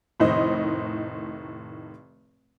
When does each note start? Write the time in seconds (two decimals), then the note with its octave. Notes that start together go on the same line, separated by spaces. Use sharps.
0.20 F1 A2 D#3 D#4 C5 D#5